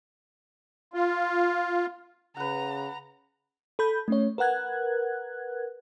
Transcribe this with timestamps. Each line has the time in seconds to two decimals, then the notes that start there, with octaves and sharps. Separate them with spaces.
0.94 F4
2.37 C#3 B4 F#5 A#5
3.79 A4 B5 G6
4.08 A3 C#4 C#5
4.38 A#4 B4 F#5 F#6 G#6